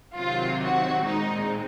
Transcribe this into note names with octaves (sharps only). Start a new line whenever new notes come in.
C3 D#3 F#3 C4 F4
F#4
A#2 G#3 C4 D#4